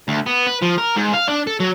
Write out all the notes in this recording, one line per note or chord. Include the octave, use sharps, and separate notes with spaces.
D2
B3
B4
F3
A#4
G#2
F5
D4
A4
F#3